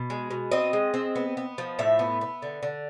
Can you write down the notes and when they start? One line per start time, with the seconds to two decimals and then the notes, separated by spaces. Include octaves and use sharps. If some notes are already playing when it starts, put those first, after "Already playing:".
Already playing: B2
0.10 G#3
0.31 B2
0.51 C4 D#5
0.73 G#3
0.94 C4
1.16 B3
1.37 B3
1.58 F3
1.79 A2 E5
1.99 B3
2.21 B3
2.42 D3
2.63 D3